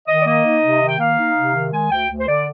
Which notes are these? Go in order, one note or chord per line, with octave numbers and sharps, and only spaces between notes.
D#3 D#5
D5
A#3 D#5
D#4
C3
D#3
G5
A#3 F5
D#4
C3
D#3
G#3 G#5
D2 G5
D2
C5
D3 D5